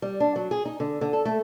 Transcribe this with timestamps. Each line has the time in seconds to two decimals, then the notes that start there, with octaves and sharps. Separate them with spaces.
0.02 G3
0.20 D4
0.36 F#3
0.51 G#4
0.65 D#4
0.80 D3
1.01 D3
1.13 A4
1.25 A3